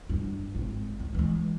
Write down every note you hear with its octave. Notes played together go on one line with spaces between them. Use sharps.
G2
G#1
C#2
E3 G#3